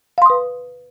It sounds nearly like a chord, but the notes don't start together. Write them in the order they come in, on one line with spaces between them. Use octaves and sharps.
F5 C6 D#6 B4